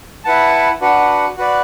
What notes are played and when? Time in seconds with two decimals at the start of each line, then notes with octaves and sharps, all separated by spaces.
0.25 E4 B4 F#5 A5
0.81 D4 F#4 B4 F#5
1.37 F#4 B4 D5